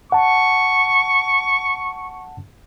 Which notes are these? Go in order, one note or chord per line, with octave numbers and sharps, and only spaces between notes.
F#5 A5 C#6